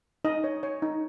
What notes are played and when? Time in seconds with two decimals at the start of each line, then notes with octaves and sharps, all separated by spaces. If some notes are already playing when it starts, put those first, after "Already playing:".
0.25 D#4 D#5
0.44 C#5
0.63 C#5
0.82 D#4